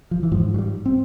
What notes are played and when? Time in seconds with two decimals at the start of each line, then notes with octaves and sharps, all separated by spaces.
0.11 F3
0.23 E3
0.32 G#2 F3
0.54 F#3
0.58 G3
0.86 C4